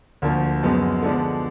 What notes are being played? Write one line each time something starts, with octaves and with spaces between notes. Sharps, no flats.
D2 D3 F3 A#3
F#2 F3 G#3 B3
D3 F3 G#3 B3 D4